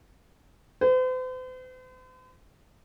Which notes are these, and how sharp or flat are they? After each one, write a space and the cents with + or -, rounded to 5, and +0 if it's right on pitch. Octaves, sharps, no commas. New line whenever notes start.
C5 -45